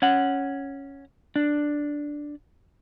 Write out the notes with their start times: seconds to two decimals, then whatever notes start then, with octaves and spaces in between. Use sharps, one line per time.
0.02 C#4 F#5
1.36 D4